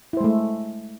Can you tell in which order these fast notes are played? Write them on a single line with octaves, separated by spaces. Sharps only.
E4 C5 G#3 A3